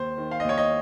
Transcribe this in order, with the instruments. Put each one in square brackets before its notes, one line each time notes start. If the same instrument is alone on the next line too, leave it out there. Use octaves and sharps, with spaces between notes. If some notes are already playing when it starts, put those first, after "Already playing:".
Already playing: [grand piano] D#2 C5
D#3
F5
D#5
D#2 C#5
D#5